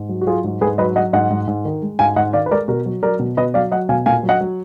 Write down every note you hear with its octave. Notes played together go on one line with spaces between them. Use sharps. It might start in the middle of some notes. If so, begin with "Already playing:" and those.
Already playing: G#2
F#3
F#4
F#3 F4 G#4
G#2
G#2 G#4 B4
F#3 B4 D#5
F#3 D#5 F#5
G#2 D#5 F#5
G#2
G#2
D#3
G#3
G#2 F5 G#5
G#2 D#5 F#5
D#3 D5 F5
B4
G#3 A#4 D5
B2 F#4 A#4
F#3
F#3 A#4 D5
B2
B2 B4 D#5
F#3 D5 F5
F#3 D#5 F#5
B2 F5 G#5
A#2 F5 G#5
F#3
D#5 F#5
F#3